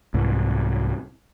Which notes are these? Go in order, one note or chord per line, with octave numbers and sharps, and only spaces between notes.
C2 G#2